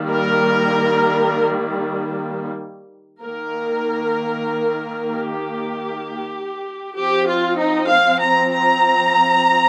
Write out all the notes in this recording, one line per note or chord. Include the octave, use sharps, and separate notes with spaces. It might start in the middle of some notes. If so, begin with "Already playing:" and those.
Already playing: D#3 G3 A#3
A#4
D#3 A#3 A#4
G4
F3 C4 G4
F4
D#4
F5
A#5
A#5